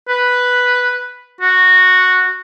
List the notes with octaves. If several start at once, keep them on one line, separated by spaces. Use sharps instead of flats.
B4
F#4